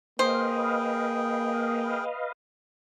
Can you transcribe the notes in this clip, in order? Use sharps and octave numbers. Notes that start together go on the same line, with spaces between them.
A#3 G#4 B4 C5 D#5 F5 G5